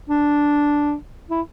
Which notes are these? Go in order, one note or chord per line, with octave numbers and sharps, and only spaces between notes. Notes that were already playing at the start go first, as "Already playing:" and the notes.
D4
E4